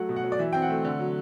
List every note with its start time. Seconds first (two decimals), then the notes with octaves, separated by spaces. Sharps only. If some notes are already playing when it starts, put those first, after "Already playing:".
Already playing: F#3 A3 F#5
0.09 B2
0.16 F#5
0.24 F#3
0.32 D5
0.39 E3 E5
0.53 C4 G5
0.62 F#5
0.70 A3
0.84 D3
0.99 F#3